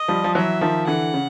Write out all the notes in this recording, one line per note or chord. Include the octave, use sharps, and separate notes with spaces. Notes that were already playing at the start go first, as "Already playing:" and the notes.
Already playing: D#5
F3 G3
F3
E3 F#3 E5
D#3 F3
D3 E3 F#5
C#3